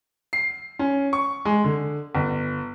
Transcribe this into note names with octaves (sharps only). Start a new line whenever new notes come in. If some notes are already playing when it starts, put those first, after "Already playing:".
C7
C#4
C#6
G#3
D3
G1